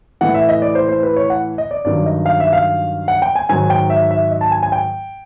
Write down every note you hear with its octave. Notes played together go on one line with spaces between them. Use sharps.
A2 E3 F#5
E5
D#5
D5
C5
C5
B4
C#5
F#5
D#5
D5
G2 D#3 F#3 D5
D#5
F5
E5
F5
F#5
G5
G#5
G#2 D#3 F#3 G#5
G5
E5
E5
D#5
A5
G#5
G#5
G5